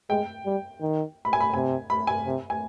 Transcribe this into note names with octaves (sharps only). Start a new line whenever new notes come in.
G#3 G5
G3
D#3
B5
G#5
B5
C3 G#5
B5
G#5
C3
G#5